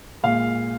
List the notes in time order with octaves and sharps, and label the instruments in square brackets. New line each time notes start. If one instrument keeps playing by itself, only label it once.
[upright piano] A#2 G#3 F5